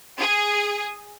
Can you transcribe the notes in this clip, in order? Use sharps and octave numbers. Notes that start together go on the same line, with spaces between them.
G#4